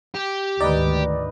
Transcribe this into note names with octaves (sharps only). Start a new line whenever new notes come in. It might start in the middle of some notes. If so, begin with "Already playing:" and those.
G4
D2 G#2 D#3 D#4 B4 D5